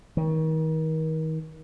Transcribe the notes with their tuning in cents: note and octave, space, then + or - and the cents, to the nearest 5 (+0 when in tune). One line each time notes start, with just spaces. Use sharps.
D#3 +35